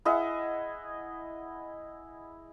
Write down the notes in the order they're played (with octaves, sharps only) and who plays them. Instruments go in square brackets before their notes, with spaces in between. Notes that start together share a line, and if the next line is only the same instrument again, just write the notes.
[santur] E4 G#4 D#5 F#5